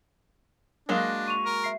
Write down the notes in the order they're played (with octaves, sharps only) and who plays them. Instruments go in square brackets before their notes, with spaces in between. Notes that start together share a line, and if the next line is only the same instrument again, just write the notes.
[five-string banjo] F#3 G#3 A#3 [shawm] D4 [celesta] F5 C#6
[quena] C#6 [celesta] D#7 F7
[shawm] A#4
[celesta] E5 C7